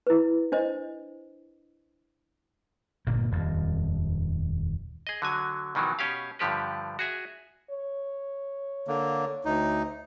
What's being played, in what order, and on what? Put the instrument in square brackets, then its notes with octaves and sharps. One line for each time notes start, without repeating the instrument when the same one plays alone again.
[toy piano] E4 B4
D4 C5 D#5
[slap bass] G1 A#2 A#3
D#1 F2
[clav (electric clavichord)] G#4 D#5
D3 F#3 G#5
B2 D#3 E3 F#3
B2 C#4 G4 F5
G2 D3 F3 G4 B4
F#4 G#4 E5
[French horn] C#5
[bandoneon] D3 A#3
D2 D#4